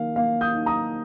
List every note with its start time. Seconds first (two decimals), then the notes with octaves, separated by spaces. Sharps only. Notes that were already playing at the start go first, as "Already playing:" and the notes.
Already playing: D#3 A#3 F5
0.16 A#3 F5
0.41 D#6 G6
0.54 D#4
0.66 A#5 D#6